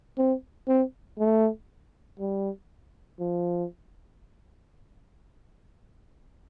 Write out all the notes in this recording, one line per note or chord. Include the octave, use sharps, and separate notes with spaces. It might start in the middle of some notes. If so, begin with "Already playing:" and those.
C4
C4
A3
G3
F3